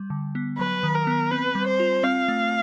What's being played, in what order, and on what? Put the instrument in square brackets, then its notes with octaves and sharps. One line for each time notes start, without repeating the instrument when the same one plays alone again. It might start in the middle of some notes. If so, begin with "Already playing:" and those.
Already playing: [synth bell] G3
D3
B3
[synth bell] F#3 [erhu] B4
[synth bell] D#3
[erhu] A#4
[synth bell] B3
[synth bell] C4 [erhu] B4
[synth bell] G3
[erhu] C5
[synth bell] F4
[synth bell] C4 [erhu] F5
[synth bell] A3